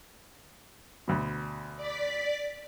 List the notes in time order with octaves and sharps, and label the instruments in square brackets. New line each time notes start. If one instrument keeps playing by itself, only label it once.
[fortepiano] D2 B2
[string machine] D5 B6